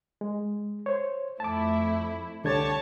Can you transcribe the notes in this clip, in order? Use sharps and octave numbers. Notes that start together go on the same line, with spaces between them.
G#3
C5 C#5
F2 A3 E4 A5 D6
C2 D3 G4 C#5 A5 G#6